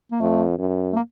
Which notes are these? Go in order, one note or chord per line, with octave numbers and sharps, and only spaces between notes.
A#3
F2 A3
F#2
A3
A#3